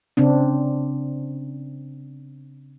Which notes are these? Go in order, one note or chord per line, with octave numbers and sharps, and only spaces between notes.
C#3 C4 D4